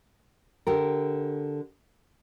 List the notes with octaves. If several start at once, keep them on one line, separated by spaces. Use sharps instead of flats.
D3 G4 A#4